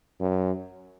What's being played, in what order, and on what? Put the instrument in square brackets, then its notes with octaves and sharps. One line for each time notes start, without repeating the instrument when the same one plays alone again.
[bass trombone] F#2